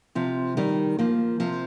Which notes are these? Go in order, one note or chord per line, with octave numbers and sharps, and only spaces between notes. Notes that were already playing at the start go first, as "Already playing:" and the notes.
C3 F3
D#3 G3
F3 A#3
C3 F3